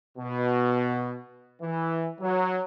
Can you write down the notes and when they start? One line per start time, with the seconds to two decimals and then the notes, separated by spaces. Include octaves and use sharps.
0.18 B2
1.62 E3
2.21 F#3